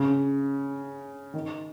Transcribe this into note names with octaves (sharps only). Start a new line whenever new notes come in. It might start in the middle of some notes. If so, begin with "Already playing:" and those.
Already playing: C#3
D#3